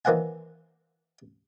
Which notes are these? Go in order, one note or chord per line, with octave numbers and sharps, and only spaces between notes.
D#3 E3 A#3 C5 F#5 G#5